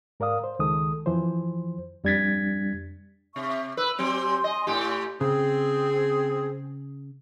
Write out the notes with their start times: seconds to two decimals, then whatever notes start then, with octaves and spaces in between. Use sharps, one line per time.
0.20 G#2 A#4 D5 F5 D#6
0.44 C5
0.59 C#2 D#3 G#3 A4 D#6
1.06 F2 E3 F3 C5
2.04 F2 G3 D4 G#6 A6 B6
3.36 C3 E5 C#6
3.77 B4 B5 E6
3.99 F#3 C4 G4 G#5 C6
4.44 D#5
4.67 A2 G4
5.21 C#3 C4 G#4